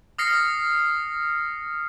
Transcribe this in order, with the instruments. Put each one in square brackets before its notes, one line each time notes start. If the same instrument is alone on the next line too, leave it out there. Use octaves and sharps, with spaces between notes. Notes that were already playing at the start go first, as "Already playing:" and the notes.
[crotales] D#6 F6 A#6 C7 C#7